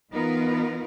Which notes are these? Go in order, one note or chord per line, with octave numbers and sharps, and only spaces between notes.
E3 B3 D#4 F4 A#4 B4